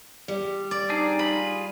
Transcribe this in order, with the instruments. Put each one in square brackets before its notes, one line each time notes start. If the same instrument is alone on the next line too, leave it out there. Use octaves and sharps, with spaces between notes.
[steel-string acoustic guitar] G3
[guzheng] D5
[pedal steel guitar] C4 D4 G#4 [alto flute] D#4
[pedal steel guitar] F4 G#4 [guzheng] B5